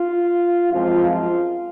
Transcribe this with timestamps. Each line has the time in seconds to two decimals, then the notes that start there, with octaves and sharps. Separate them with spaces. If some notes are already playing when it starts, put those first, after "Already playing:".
Already playing: F4
0.71 F#2 F3 G#3 C4 F4
1.10 F4